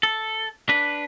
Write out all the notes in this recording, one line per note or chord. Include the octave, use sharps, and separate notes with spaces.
A4
D4 B4